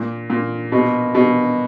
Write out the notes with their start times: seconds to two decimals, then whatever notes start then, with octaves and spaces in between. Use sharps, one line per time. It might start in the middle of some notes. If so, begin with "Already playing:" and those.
Already playing: A#2
0.30 A#2
0.72 B2
1.15 B2